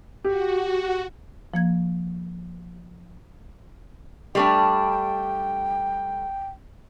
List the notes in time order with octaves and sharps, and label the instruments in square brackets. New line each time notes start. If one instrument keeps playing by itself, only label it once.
[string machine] F#4 [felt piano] G4
[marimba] F3 A#3 G#6
[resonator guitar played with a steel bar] G3 A3 D4 [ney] G5